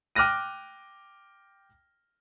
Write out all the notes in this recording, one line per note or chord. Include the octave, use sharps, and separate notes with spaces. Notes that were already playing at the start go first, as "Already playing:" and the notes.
G5 D6 F6 F#6 A#6 D#7